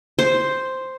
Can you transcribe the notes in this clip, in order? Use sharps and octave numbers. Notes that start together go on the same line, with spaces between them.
C5